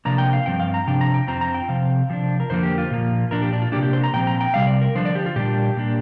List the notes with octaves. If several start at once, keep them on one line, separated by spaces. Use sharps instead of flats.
C3 F3 A#3 D4 A#5
G5
F5
G2 F3 C4 G5
F5
A#5
C3 F3 D4 G5
A#5
G5
F2 F3 C4 A#5
A#5
G5
C3 F3 C4 F5
C3 F3 D4
A#4
F2 D3 F3 A#3 C5
G4
F4
A#2 F3 A#3
A#2 F3 D4 A#4
G4
D4
F4
C3 A#3 D4 G4
G4
C5
A#5
A#2 F3 C4 G5
A#5
G5
C3 G3 F5
D5
A#4
D3 F3 D4 C5
D5
G4
F4
A#2 G3 A#3 D4 G4
A#2 A#3 D4